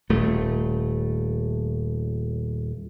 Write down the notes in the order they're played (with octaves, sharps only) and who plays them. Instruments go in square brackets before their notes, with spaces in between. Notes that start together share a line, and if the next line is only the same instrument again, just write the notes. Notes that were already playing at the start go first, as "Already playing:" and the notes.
[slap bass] D#1 A3